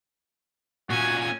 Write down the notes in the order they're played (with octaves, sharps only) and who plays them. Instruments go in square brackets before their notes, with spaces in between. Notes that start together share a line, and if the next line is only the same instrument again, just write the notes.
[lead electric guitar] A#2 C#4 [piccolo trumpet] F#4 [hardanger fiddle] G#5